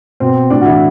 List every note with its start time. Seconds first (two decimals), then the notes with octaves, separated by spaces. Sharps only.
0.20 B2 C4
0.50 A2 D4
0.61 F#4
0.65 E3 E4